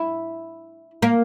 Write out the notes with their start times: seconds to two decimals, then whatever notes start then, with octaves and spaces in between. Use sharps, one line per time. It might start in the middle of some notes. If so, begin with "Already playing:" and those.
Already playing: E4
1.02 A#3